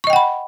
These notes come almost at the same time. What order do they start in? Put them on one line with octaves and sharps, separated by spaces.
C#6 D#5 G5 F#5 B5